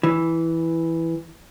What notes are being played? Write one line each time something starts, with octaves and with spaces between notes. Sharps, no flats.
E3